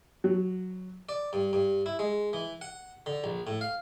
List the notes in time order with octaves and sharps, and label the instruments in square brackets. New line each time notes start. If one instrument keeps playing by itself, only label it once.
[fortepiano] F#3
[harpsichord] D5
G2
G2
E4
G#3
E3
F#5
D3
A#1
A2
F5